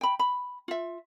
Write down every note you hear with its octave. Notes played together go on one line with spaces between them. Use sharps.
G5 B5
B5
F4 E5